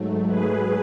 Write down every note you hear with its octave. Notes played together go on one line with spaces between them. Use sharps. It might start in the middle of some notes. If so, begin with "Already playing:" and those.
Already playing: G#2 F#3 A3
G#4 B4